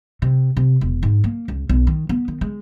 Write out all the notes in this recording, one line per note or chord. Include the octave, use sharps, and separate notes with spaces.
C3
C3
E1
G#2
A#3
C#2
B1
D#3
B3
D#3
G#3